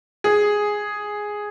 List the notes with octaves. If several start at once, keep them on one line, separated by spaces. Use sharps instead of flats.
G#4